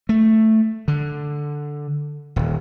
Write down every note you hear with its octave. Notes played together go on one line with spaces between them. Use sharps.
A3
D3
D#1